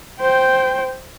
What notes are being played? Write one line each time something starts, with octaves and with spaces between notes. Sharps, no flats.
C5 G5